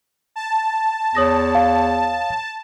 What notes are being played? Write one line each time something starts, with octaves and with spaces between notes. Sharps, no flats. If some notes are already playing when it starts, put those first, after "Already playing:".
A5
E2 C#5 D#6 A#6
F5